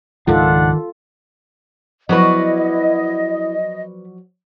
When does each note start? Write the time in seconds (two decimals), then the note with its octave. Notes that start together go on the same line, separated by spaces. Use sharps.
0.27 C#2 G#2 D#3 F3 D4 F4 A4 F#5
2.09 F3 F#3 B3 E4 F#4 B4 D5 D#5